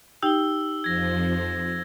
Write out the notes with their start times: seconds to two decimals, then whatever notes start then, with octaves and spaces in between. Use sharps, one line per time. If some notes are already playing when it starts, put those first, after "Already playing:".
0.22 D#4 G4 G5 E6 G7
0.84 F2 F3 G#6 A#6